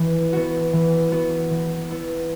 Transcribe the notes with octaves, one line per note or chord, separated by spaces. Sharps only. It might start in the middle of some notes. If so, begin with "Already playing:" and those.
Already playing: E3
B3 F#4
E3
B3 F#4
E3
B3 E4